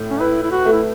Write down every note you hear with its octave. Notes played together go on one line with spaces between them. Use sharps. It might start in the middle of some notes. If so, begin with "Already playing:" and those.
Already playing: A2
C#4
E4 B4
E4
F#4
A3
E4